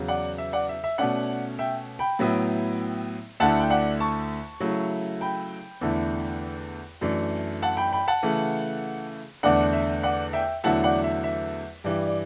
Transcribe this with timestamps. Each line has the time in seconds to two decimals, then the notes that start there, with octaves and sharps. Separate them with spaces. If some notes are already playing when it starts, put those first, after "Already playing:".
Already playing: E2 C#3 F#3
0.08 D5 F#5
0.38 E5
0.53 D5 F#5
0.69 E5
0.84 E5
0.98 B2 A3 C#4 D5 F#5
1.59 E5 G5
1.99 G5 B5
2.19 A2 F#3 B3 E4
3.40 D2 D3 A3 E4 F#5 A5
3.60 G5
3.70 D5 F#5
4.00 A5 C#6
4.60 C#3 F#3 A3 E4
5.21 G5 B5
5.81 E2 D3 A3 E4
7.01 F#2 E3 A3 D4
7.62 F#5 A5
7.77 G5 B5
7.92 G5 B5
8.08 F#5 A5
8.23 C#3 E3 A3
9.43 E2 D3 A3 D4 D5 F#5
9.73 E5
10.03 D5 F#5
10.33 E5 G5
10.64 E2 D3 F#3 A3 E4 F#5 A5
10.84 D5 F#5
11.04 E5
11.24 E5
11.84 G2 E3 G3 D5
12.07 D5